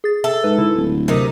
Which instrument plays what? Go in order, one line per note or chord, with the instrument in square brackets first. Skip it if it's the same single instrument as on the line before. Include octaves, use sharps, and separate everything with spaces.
[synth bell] G#4 A6
[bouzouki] A4 [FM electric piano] E5
[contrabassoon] G#2 [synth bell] B4
[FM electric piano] C#3 [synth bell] E4
[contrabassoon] D1
[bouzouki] C3 D#4 [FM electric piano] F#3 A#4